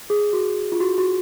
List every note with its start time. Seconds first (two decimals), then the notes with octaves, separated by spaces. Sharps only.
0.10 G#4
0.33 F#4
0.72 F4
0.80 F#4
0.98 F#4